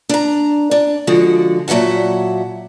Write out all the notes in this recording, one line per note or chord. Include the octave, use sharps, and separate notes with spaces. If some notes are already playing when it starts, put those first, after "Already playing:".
D4 A#5
D4
D3 F3 G#3 F#4
A#2 F#3 E5 F#5 A5